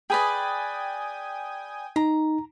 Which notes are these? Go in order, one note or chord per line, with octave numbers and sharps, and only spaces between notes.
G#4 B4 D5 G5 G#5 D#6
D#4 A#5